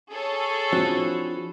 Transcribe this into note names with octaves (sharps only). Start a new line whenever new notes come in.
G#4 A4 C#5
F3 C4 D4 E4 F#4